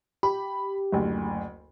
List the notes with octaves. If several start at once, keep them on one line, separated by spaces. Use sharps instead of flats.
G4 B5
F#1 D2